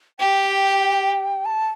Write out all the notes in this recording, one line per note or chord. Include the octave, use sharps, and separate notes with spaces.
G4 G5
A5